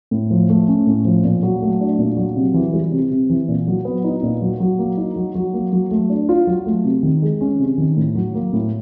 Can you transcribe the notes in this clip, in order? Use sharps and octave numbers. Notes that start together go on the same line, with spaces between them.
A2
F3
A3
C#4
A2
F3
A#2
F#3
A3
D4
A#2
F#3
C3
E3
G3
C3
C3
E3
A#2
F#3
B3
D#4
A#2
F#3
F#3
A#3
D#4
F#3
F#3
A#3
F#3
A3
D4
F4
F#3
A3
C3
D#3
G#3
C#4
C3
D#3
A2
F#3
A#3
A2